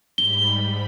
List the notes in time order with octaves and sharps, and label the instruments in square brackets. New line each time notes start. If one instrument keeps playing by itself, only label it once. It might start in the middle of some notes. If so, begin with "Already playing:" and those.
[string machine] G#2 G3 B5 [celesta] G7